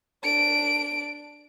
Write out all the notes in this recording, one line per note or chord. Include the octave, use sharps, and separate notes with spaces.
D4 D7